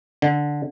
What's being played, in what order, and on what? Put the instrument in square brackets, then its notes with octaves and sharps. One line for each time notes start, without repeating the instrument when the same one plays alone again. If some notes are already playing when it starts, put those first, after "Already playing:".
[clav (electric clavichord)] D3